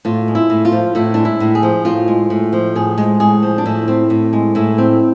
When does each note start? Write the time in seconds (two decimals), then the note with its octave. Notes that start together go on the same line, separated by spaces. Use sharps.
0.05 A2 F4
0.28 G#3
0.35 E4
0.50 A2
0.65 F4
0.72 F3
0.95 A2 E4
1.14 G#3 D4
1.25 E4
1.40 A2
1.55 G#4
1.63 F3
1.85 A2 F4
2.08 G#3
2.30 A2
2.53 F3
2.76 A2 G#4
2.98 G#3
3.20 A2 G#4
3.42 F3
3.58 D4
3.66 A2 E4
3.88 C4
4.10 A2
4.33 G#3
4.55 A2 E4
4.78 C4